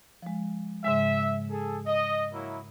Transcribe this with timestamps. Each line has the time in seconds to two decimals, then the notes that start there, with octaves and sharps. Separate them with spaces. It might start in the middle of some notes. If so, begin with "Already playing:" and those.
0.22 F3 G#3
0.84 G#2 C#3 G#3 E5
1.50 G#4 A4
1.86 D#5
2.33 F#3 A#3 E4